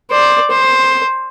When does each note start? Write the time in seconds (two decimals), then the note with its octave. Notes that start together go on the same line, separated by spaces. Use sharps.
0.11 C5 D5
0.51 C5